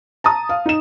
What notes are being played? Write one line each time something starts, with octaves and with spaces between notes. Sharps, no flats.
A5 A#5 D#6
F5
D#4 E7